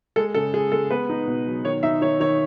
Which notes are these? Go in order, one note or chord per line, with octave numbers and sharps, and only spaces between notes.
G#3 A4
C#3 A4
G#3 G#4
G#3 A4
B3 B4
D#4
B2
F#3
D#3 C#5
D#4 E5
D#3 C#5
D#3 C#5